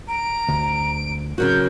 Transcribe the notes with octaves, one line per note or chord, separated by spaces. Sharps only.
A#5 D7
D2
C#3 F#3 F#4 A#4 G6